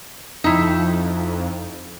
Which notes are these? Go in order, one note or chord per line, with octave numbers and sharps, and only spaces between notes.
F2 D#4 E4